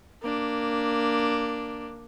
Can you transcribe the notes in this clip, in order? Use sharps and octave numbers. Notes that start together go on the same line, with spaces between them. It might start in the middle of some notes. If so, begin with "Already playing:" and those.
A#3 D4